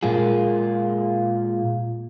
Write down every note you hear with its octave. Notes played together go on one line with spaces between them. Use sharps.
A#2 G#3 A#3 F4 G#4